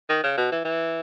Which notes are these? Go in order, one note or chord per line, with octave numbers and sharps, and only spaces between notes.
D#3
C#3
B2
E3
E3